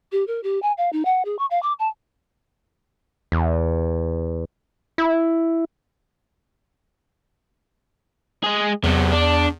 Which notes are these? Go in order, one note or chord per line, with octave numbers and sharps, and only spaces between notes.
G4
A#4
G4
G#5
F5
D#4
F#5
G#4
C#6
F5
D6
A5
E2
E4
G#3 G#4
E2 C3 F#3
D4